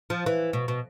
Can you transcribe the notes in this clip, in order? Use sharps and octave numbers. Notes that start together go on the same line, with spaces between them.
F3
E3
B2
B2